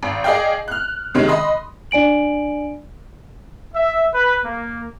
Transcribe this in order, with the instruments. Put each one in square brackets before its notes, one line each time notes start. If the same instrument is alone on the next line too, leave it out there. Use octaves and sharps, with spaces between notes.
[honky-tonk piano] G#1
G#4 D5 D#5 F5 G5
F6 F#6
C3 D#3 G#3 C#4
D#5 B5 C6 D#6
[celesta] D4 D5 G#5 D7 F#7
[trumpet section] E5
B4
A#3